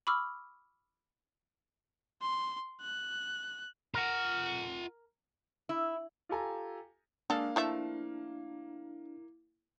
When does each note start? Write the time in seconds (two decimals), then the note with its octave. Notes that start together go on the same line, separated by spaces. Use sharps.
0.07 B5 C#6 D6 E6 F6
2.22 C6
2.81 F#6
3.94 F4 A#4 F#5
5.69 E4
6.29 F4 G4 A4 G#5 A#5
7.30 G#3 A#3 D4 A4 F5
7.56 F3 A3 E4 E5